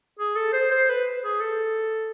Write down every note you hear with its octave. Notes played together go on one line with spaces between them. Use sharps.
G#4
A4
C5
C5
B4
G#4
A4